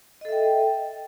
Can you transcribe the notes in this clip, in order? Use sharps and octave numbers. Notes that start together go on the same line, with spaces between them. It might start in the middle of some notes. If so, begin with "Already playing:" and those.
A4 D#5 E5 G5